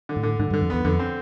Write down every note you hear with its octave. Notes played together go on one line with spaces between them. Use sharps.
D3
A2
D3
G#2 D3
G2 D3
F2
E2 B3
F2 D3
C4